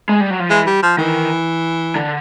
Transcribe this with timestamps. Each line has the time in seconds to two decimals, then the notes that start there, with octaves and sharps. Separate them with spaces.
0.09 G#3
0.20 G3
0.31 F#3
0.40 F3
0.49 E3 G#3
0.66 G3
0.83 F3
0.98 D#3 E3
1.96 D3